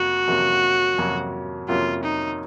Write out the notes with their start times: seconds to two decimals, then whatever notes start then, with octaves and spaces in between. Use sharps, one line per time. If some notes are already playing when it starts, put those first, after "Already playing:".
Already playing: F2 C3 F#3 A#3 F#4
0.27 F2 C3 F#3 A#3 C#4
0.98 F2 C3 F#3 A#3 C#4
1.69 F2 C3 F#3 A#3 C#4 F4
2.04 D#4